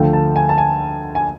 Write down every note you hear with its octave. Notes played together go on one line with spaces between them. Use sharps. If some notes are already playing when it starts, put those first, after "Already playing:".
Already playing: D2 D3 F3 A3 G5
A5
G#5
A5
G#5
G#5